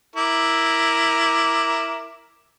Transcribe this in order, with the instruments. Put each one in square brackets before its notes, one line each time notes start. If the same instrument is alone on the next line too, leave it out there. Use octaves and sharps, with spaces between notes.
[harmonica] E4 A#4 D6